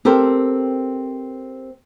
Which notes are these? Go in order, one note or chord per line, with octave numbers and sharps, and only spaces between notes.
C4 G4 A4 A#4 C5